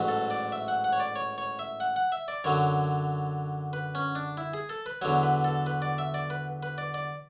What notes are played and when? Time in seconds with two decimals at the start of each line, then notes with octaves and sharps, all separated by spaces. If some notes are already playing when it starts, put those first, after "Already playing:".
Already playing: A1 G#2 F#3
0.08 A4
0.31 D5
0.52 E5
0.68 F#5
0.84 F#5
0.93 C#5
1.00 D5
1.16 C#5
1.38 C#5
1.59 E5
1.80 F#5
1.96 F#5
2.12 E5
2.28 D5
2.44 F#2 D3 F#3 C#5
3.73 B4
3.95 C#4
4.15 D4
4.37 E4
4.54 G#4
4.69 A4
4.86 B4
5.01 E2 D3 F#3 C#5
5.23 B4
5.44 A4
5.66 B4
5.82 D5
5.98 E5
6.14 D5
6.30 B4
6.63 B4
6.78 D5
6.94 D5